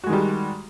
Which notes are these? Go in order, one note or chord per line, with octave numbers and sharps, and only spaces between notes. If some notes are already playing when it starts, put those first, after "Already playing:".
D#3 G3 G#3 F#4